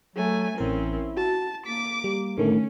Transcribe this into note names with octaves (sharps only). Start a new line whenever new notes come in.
F#3 A3 G#5
A1 C4 C#4 E4 A#4
F#4 A5
A#3 D6 B6
G3
A2 D3 D#3 A3 C#4